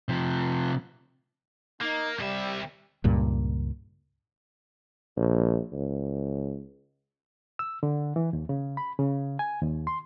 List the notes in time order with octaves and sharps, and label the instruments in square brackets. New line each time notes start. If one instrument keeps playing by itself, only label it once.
[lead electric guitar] C3 F3
[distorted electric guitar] A#3 [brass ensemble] D#4
[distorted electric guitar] C2 E5 [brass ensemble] G3
[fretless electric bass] C#2 G2 A#2
[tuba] A#1
C#2
[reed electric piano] E6
D3
E3
D#2
C#3
B5
C#3
G#5
D#2
C6